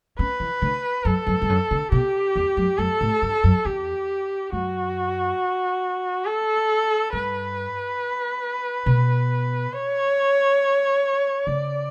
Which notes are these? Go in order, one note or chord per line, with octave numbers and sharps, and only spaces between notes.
C#4 B4
E3
D3
F#2 A4
F#2
G2
F#2
D3
B2 G4
E2
F#2
F#2 A4
A2
G2
F#2
E2 G4
F#2 F#4
A4
G2 B4
B2
C#5
C#3 D5